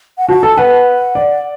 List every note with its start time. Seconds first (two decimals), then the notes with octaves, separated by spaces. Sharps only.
0.18 F#5
0.29 F#4 A5
0.43 A4
0.58 B4 F#5
1.15 D5